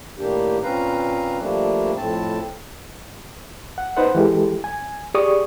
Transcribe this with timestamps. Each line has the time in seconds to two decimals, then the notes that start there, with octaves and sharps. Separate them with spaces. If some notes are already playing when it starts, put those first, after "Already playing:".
0.19 A2 D#3 A#3 D4 G4
0.63 A#2 C4 C#4 B4 F5 A#5
1.39 F3 G3 A3 A#3 D4
1.97 F2 A2 C4 A5
3.78 F#5
3.97 D#4 B4 C5 F#5
4.15 E3 G#3 G4 A4
4.64 G#5
5.14 G4 G#4 D5 C#6 D#6